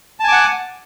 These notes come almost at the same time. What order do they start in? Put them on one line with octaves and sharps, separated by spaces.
A5 G#5 D6 F#5